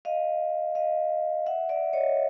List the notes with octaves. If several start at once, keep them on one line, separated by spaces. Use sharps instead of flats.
D#5 F5
D#5 F5
E5 F#5
D5 E5
C#5 D#5